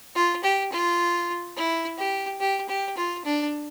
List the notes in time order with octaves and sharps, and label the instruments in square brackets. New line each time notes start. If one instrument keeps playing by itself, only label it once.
[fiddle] F4
G4
F4
E4
G4
G4
G4
F4
D4